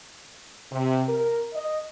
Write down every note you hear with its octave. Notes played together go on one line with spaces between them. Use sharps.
C3
A#4
D#5